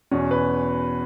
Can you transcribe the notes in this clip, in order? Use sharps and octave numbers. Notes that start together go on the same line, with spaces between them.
E2 B2 C#4
B4